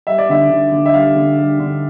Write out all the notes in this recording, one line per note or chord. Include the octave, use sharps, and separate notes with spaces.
G3 E5
D5
D3 E5
D3
D3
E5
G3 F5
D3
G3
D3